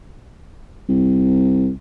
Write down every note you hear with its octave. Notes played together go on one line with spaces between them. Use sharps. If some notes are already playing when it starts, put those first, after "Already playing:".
C2